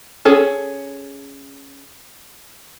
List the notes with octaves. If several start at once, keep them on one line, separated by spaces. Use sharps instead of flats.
C#4 G#4 A4